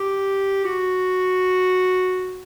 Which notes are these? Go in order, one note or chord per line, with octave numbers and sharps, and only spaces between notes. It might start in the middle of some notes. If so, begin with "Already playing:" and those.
Already playing: G4
F#4